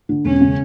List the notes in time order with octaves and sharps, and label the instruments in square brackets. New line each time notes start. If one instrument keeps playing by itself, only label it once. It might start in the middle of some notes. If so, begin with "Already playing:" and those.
[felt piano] D3
[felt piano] E1 [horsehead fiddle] C#4
[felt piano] C#3